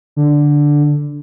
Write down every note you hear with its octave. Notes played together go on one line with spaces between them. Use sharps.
D3